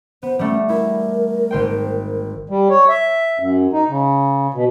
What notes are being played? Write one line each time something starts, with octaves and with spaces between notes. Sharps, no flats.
B3 C5
G3 A3 C#4
E4 A#4
G#1 C5 G5
G3
C#5
E5
F#2
D#4
C#3
B2